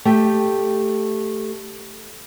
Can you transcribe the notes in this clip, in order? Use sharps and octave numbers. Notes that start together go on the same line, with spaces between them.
A3 G4 G5